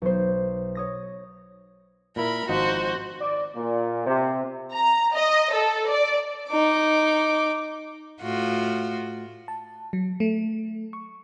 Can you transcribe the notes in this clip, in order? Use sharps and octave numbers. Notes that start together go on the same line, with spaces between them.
B1 C5
C#5 D#6 A#6
A#2 E4 A#4 B5
G#1 F3 D#4 F#4 C5
D5
A#2
C3
A#5
D#5
A4
D5
D#4 D6
A2 F4 F#4
A5
F#3
A3
C#6